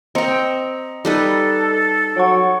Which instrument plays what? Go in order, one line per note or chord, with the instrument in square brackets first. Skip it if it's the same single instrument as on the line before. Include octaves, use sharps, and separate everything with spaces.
[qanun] C4 G5 [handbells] D#5 A#5 C#7
[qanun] G3 D#4 B4 [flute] A4
[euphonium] F#3 [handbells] C#5 F#5 C#6